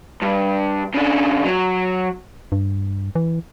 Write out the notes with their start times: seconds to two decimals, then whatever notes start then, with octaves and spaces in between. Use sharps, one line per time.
0.22 G2
0.94 C#3 D4
1.45 F#3
2.52 G2
3.15 E3